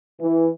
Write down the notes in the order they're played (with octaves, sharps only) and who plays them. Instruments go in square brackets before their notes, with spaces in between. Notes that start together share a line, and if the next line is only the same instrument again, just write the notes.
[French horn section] E3